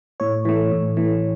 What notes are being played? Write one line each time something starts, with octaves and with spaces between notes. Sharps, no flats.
A2 C#5
E3 A3
A2
E3 A3